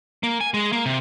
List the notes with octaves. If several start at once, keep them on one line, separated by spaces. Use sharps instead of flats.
A#3
G#5
G#3
A#3
C3